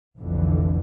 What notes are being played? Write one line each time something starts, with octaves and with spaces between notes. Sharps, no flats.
F1 B1 F2 D3 E3